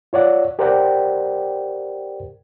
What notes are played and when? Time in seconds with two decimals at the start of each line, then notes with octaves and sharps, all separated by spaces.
0.13 F4 C#5 D5 F#5
0.59 G4 A#4 C5 D5 F#5 G5